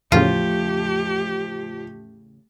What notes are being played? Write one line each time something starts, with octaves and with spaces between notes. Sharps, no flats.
E2 A2 C#3 F3 A3 F4 G4